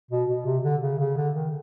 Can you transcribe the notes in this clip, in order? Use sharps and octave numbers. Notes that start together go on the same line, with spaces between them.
B2
B2
C3
D3
C#3
C#3
D3
D#3